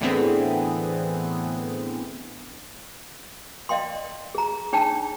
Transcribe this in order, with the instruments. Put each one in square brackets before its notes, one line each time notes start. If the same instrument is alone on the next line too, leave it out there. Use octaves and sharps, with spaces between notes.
[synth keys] A2 D3 E3 B3 C4 G#4
[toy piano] D5 D#5 F5 G5 C6
G#4 A#5
D4 D#4 G#4 C#5 G5 A5